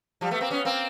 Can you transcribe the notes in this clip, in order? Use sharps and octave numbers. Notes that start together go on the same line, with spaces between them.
F3 G3
A3 B3
A#3 C4
B3 C#4
A#3 C4